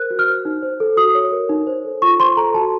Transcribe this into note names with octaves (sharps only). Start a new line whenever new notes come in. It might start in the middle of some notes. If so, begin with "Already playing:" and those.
Already playing: A#4 C5 F#6
F#4
F6
C5
D#4
C5
A4
F#4 D#6
C#5
A#4
D#4
C5
A4
F4 C#6
C5 C6
A4 A#5
F#4 A5